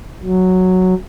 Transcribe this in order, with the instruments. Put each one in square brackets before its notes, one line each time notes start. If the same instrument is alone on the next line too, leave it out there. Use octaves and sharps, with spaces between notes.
[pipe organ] F#3